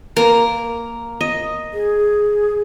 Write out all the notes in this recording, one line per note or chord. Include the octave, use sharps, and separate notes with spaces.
A#3 A#4
D#5
G#4